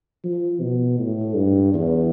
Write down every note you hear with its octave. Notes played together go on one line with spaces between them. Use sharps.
F3
B2
A2
G2
E2